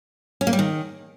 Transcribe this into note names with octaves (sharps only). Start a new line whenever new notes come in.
C#4
A#3
G3
D#3